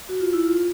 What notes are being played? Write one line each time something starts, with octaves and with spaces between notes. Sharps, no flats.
F#4
F4
E4
F4